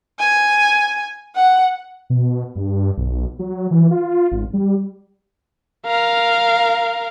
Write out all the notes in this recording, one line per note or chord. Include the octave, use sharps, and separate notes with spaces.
G#5
F#5
B2
G2
B1
F#3
E3
F4
G#1
G3
A#4 F5